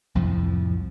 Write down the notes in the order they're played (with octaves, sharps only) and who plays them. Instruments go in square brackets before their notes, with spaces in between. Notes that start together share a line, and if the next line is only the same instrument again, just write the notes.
[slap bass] C2 F2 A2 F3